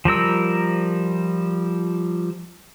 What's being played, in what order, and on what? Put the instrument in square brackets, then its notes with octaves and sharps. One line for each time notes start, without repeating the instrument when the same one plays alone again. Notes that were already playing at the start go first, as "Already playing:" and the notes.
[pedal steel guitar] F3 G3 A#4 E6